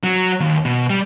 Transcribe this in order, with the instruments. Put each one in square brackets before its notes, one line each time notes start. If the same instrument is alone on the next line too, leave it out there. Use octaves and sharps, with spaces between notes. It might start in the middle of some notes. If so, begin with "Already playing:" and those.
[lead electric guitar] F#3
D#2
B2
G3